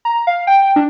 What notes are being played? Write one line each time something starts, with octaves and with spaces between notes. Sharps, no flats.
A#5
F5
G5
G5
D4